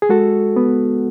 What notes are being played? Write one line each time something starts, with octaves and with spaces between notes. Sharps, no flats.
G#4
G#3 F#4 A4
B3